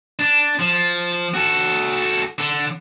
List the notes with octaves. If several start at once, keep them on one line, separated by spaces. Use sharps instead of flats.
D4
F3
F#4 A4
D3